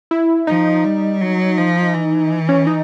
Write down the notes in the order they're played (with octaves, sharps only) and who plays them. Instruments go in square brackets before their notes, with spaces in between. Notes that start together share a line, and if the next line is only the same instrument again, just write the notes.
[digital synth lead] E4
[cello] F3 [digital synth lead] D#4
[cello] G3
F#3
F3
E3
[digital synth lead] C#4
D#4